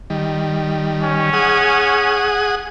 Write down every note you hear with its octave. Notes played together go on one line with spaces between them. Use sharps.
D#3 G3
C#4
G#4 F#5 D#6